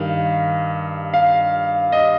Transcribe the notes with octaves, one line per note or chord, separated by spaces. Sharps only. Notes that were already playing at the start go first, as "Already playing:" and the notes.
Already playing: G2 D#3 F5
F5
D#5